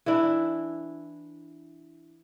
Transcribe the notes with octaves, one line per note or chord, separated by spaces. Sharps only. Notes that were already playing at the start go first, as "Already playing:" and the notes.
E3 D4 E4